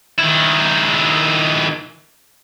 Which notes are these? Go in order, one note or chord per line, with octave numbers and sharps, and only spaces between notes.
D#3 E4